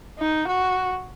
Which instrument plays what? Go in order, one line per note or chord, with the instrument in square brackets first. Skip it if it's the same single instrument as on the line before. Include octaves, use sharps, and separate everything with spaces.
[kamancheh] D#4
F#4